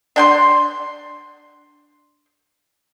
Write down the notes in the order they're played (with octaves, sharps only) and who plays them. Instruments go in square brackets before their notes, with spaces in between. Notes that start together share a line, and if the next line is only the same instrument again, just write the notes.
[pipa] D4 G5 C6